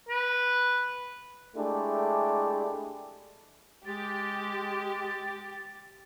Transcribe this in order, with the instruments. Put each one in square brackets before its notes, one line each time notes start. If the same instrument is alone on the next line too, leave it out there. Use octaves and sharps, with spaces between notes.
[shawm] B4
[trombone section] G#3 A3 D4 E4 G4
[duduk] G#3 [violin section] G4 [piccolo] A6